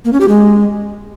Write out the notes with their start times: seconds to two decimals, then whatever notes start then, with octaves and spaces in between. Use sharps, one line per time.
0.05 A#3
0.13 C#4
0.21 G4
0.28 G#3